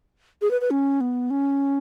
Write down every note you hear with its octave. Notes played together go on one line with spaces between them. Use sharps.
G#4
B4
B4
C#4
B3
C#4